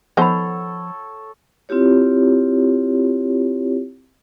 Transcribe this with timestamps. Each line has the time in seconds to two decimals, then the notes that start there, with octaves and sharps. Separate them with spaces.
0.17 F3 B3 D#4 A4 C5 C#5 F#5 B5
1.69 C4 E4 F4 G4 C#5